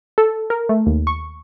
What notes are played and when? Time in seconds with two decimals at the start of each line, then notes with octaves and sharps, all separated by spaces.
0.18 A4
0.50 A#4
0.69 A3
0.86 D#2
1.07 C#6